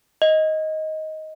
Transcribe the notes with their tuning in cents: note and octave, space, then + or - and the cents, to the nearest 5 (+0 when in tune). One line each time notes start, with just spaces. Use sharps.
D#5 +10